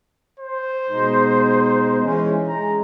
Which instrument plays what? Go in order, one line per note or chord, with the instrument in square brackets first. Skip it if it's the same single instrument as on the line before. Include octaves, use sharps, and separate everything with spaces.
[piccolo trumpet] C5
[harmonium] B2 G#3 D#4
E3 G#3 C#4
[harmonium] G#3 [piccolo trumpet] A#5